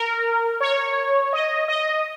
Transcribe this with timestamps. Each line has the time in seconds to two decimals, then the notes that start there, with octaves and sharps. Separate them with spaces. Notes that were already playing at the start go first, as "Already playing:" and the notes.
Already playing: A#4
0.60 C#5
1.33 D#5
1.68 D#5